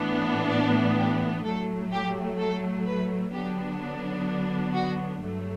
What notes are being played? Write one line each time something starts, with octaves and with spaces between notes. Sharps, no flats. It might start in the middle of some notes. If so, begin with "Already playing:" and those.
Already playing: A2 E3 B3 D4
D5
G4
A2 F#3 A3 A4
G4
A4
B4
D3 F#3 B3 D4 G4
F#4
G2 F#3 A3